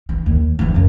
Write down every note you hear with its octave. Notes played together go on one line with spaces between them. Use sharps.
E3
D#2
E2 F3
F#2 C#4